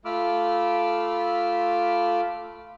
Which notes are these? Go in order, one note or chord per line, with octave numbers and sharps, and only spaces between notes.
A3 F4 B5 D6 E6 F6